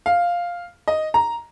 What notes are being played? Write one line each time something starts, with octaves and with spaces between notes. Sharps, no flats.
F5
D#5
A#5